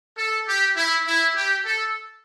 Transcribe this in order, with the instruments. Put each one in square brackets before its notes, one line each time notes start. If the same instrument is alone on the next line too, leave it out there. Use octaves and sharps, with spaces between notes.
[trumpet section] A4
G4
E4
E4
G4
A4